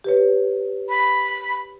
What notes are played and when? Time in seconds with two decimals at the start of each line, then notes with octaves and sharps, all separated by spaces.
0.04 G4 B4 C#5
0.89 B5